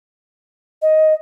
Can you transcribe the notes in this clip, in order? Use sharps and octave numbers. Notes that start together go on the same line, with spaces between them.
D#5